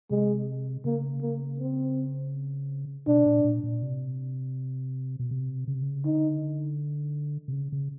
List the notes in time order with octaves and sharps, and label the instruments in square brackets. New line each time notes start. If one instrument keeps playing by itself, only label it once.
[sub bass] C3 [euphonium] G#3
[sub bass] C#3 [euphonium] A#3
[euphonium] A#3
C4
[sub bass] B2 [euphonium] D4
[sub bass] A#2
A#2
A#2
C3
B2
C3
C#3
C3
C#3
[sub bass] D3 [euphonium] D#4
[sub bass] C3
C#3
C#3